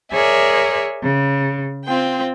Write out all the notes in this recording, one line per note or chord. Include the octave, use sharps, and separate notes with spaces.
G#4 A#4 C#5 D5 E5 G#5
C#3
C4 F4 G5